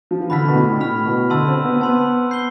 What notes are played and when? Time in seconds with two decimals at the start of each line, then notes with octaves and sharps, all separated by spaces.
0.11 F3
0.20 E3
0.30 D3 B5 F6 B6
0.48 B2
0.55 A2
0.80 A2 B5 F6 B6
1.06 B2
1.30 D3 A5 C6 E6
1.48 C4
1.64 B3
1.81 B3 A5 C6 E6
2.31 G6 C7 G7